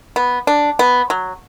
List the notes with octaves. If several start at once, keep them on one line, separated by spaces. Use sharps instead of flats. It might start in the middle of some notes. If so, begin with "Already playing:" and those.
B3
D4
B3
F#3